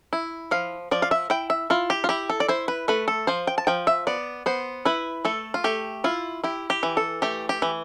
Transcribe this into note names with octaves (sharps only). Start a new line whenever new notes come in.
E4
F3 F5
F3 D5
F5
E5
E4 G5
E5
E4 F4
G4
F4
E4 G4
A4
D5
E4 C5
B4
A3 B4
A4
F3 C5
G5
A5
F3 G5
E5
B3 D5
B3 C5
E4 B4
A3 A4
F4
A3 G4
E4 F4
E4 G4
G4
E3
A4
A3 G4
G4
E3